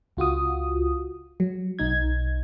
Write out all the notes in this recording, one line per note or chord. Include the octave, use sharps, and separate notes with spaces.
C#2 F4 F#4 D#6
F#3
B1 D#4 G#6